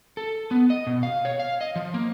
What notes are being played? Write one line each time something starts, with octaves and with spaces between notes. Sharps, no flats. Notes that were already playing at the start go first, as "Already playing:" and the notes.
A4
B3
D#5
B2
F5
C#5
F5
D#5
F3
A#3